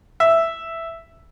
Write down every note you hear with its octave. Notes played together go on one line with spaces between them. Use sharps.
E5